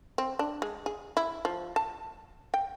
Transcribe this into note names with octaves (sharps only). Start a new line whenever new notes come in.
C4
D4
G#3
G#4
E4
F3
A5
G5